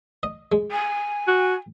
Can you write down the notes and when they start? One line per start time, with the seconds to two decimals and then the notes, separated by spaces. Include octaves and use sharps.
0.23 D#5
0.52 G#3
0.72 G#5
1.28 F#4